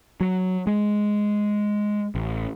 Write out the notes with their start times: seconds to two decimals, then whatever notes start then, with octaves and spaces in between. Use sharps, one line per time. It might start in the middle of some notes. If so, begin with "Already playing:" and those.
0.21 F#3
0.67 G#3
2.15 A1